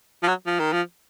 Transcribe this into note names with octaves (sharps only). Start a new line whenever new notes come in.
F3
F#3
F3
D#3
F3